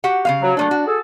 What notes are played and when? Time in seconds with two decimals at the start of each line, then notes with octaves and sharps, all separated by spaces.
0.04 F#4 G4 F#5
0.25 C#3 G#3 F5
0.42 F#3
0.57 F#3 A3 A#3 D4
0.71 F#4
0.87 G#4 A4